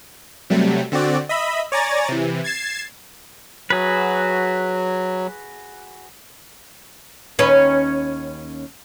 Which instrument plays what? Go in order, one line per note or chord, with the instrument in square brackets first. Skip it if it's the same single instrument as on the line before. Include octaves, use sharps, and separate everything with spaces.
[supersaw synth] C3 F#3 G3 A3
D3 C4 F#4 D5
D#5 E5 B5
C#5 D5 G#5 A#5 A6
C3 E3
G#6 A6 C7 E7
[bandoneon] F#3 [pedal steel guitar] F#4 G#4 B4
[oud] D#2 C#4 B4